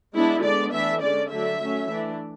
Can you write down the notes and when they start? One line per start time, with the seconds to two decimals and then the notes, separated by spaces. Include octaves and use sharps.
0.15 G#3 B3 D4 E4
0.43 D3 G#3 B3 D4 D5
0.73 E3 A3 D4 E5
1.01 D3 G#3 C#4 D5
1.30 D3 F#3 A3 D4 E5
1.60 F#3 A3 C#4
1.88 E3 A3 D4